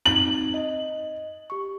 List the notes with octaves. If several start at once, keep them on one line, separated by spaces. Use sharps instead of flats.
C4 D#4 F#7
D#5
G4 C#6